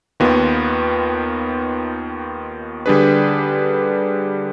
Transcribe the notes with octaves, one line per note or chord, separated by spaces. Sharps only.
D#2 D#3 B3 F4
D3 G3 D4 G#4 B4